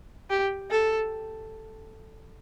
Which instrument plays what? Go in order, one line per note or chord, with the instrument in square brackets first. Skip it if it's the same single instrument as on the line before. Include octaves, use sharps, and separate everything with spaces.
[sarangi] G4
A4